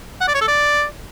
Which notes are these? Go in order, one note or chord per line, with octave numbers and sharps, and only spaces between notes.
F#5
D5
C#5
A4
D5